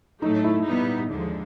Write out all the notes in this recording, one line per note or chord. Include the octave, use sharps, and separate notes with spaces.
A2 F#3 A3 D#4
E4
A#2 G3 B3 D#4
D#2 D3 F3 G#3